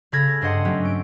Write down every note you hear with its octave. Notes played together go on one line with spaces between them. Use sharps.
C#3 A4 B5 F6 G#6 A#6
G2 D4 C5 D#5 F#5 C6
F#3 A3 C4 C#4 G4
D7